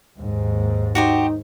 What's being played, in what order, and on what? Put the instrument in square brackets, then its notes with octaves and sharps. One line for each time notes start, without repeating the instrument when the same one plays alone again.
[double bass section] D#2 G#2
[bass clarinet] D#4 [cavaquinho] F#4 G4 C5